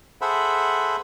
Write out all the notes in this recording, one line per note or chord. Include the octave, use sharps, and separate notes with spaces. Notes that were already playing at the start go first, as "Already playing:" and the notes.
G#4 A4 C5 E5 F#5 B5